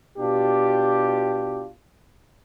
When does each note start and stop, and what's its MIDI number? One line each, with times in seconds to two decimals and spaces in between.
0.18 1.68 47
0.18 1.68 62
0.18 1.68 65
0.18 1.68 67